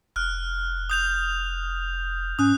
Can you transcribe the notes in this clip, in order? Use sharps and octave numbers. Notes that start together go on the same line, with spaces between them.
F1 F6 F#6
D#6 G6 F7
G#2 C#4 D#6 F#6